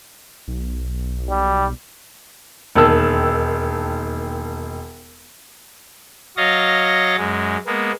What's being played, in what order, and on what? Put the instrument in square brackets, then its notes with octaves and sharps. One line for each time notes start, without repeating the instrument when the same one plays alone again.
[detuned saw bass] B1
[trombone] G3
[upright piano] E1 D#2 A5 E6
[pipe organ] F#3 C#5 D#5 F5 A6 A#6
F#2 G#3
G#3 A#3 B3